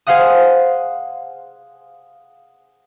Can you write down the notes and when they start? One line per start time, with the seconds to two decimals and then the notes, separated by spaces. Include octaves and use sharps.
0.07 G#4 C5 F5 F#5 D#6